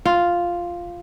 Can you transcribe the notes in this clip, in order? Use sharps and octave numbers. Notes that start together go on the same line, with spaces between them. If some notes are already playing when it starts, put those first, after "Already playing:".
F4